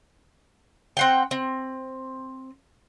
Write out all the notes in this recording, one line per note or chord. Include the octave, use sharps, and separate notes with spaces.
C4 F#5 G5
C4